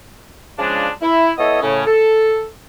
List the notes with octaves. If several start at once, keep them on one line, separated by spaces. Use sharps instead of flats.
C#3 F3 G#3 D4
E4
B3 E4 A4 C#5 D#5
A2 C#3 C#4
A4